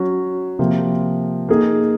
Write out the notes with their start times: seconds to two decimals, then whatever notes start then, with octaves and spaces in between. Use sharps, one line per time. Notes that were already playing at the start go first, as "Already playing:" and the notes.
Already playing: F#3 C#4 F#4 C#5
0.59 C3 F3 A#3 F4
1.49 A#3 D#4 G#4